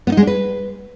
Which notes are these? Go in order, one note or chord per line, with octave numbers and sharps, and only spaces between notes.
B3
D#4
G#3
D4
B4